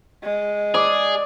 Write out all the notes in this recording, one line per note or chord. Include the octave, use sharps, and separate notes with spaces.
G#3
G#4 D5